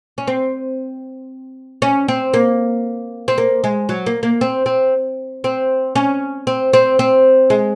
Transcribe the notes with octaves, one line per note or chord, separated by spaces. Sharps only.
C#4
C4
C#4
C4
A#3
C4
A#3
G#3
F#3
A#3
A#3
C4
C4
C4
C#4
C4
C4
C4
G#3